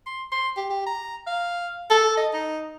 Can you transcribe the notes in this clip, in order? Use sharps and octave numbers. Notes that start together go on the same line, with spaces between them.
C6
C6
G4
G4
A#5
F5
A4
D#5
D#4